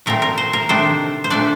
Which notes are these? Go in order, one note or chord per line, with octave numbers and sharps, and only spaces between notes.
A#2 A3 C4 A#4
A#4
C5
A#4
C3 D#3 A3 D4 C5
C5
A#2 A3 D4 D5